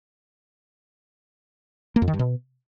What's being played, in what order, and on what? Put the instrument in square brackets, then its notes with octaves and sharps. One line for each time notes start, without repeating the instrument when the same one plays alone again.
[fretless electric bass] A#3
F2
D#3
G2
B2